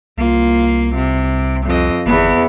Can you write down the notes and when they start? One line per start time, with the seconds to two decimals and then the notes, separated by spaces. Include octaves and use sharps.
0.17 C2 A#3 F4
0.95 C3
1.66 F2 D#5
2.06 G1 E2 B3